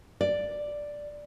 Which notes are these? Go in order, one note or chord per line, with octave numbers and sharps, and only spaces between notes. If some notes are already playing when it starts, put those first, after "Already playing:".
D5